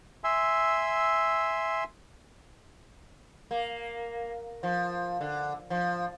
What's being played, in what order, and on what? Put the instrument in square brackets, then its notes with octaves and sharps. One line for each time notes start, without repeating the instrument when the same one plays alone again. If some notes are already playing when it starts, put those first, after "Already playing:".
[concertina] E5 G#5 C6 E6
[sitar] A#3
F3
D3
F3